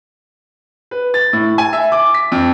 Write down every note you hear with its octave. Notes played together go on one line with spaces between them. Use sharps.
B4
A6
A2
G#5
E5
D6
B6
F2